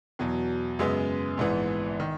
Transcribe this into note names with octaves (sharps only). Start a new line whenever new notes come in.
E2 B2 F#3
F#2 C#3 G#3 B3
A#1 G#2 E3 B3
D#3